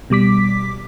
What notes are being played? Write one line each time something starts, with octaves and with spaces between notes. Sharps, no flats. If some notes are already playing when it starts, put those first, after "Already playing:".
B2 G3 D6 B6